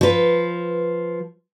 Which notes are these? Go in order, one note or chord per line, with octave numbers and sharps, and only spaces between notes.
F3 B4